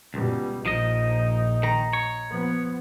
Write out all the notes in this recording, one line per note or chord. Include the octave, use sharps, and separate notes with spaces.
C#2 B2 G3
A#1 F3 D#4 D#5
D#3 A#5
C#5
F3 B3